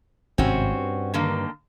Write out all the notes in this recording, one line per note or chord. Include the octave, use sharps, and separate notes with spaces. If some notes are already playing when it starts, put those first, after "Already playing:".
G#1 G2 C3 C4 C#4 F#4
G2
D3 D#3 A#3